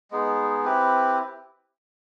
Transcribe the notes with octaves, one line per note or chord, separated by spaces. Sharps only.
G#3 B3 D#4 G#4
C4 E4 G4 B4